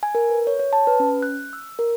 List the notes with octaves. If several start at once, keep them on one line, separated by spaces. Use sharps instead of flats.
G#5
A#4
B4
C#5
C#5
A5
B4
C#4
F#6
E6
A#4